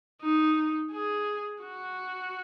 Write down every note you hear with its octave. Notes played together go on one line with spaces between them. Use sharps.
D#4
G#4
F#4